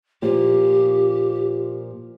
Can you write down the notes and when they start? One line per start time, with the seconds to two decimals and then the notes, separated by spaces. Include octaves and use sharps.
0.22 A#2 F3 G4